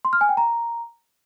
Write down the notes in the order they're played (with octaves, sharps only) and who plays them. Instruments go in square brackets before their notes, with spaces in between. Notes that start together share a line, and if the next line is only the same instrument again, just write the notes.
[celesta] C6
F6
G#5
G5
A#5